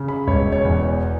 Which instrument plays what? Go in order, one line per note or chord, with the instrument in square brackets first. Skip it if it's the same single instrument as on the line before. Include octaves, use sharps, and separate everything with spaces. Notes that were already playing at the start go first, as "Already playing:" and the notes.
Already playing: [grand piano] C#3
B5
E1 C#5
C#5
E2